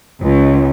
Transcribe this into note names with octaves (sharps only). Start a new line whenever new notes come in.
C#2